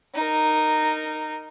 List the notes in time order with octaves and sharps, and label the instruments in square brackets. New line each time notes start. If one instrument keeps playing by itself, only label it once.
[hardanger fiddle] D#4 A#4